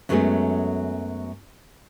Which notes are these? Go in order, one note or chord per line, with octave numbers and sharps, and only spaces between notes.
F#2 F#3 G#3 A3 B3 G#4